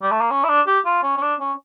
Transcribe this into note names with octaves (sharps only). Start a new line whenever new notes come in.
G3
A3
A#3
C#4
E4
D4
G4
F4
C#4
C#4
D4
C#4